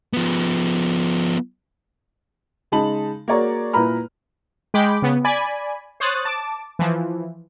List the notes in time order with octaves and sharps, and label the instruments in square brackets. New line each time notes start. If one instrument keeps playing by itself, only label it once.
[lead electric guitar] F3 B3
[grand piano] C#3 G#3 D#4 A5 B5 F#7
A#3 F#4 G#4 C#5 D5 A#5
A#2 E4 B4 A#5 B5 F6
[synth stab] G#3 G5 B5 D6
C#3 B3
D5 G#5 B5
C5 C#5 D#6 F#6 A6
A5 D6
E3 F3